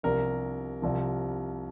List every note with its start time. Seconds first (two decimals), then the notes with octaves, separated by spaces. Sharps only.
0.03 C2 C3 F3 A#4
0.82 C2 C3 F3